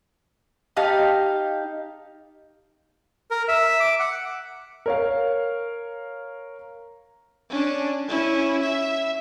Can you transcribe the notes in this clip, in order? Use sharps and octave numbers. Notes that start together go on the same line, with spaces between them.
D#4 G4 F5 A5
A#4
E5
D6
F#5
A#4 C#5 F5
C#4 D4
C#4 E4
E5